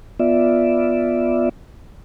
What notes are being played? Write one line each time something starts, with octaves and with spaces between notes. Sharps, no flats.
B3 F4 D5 E5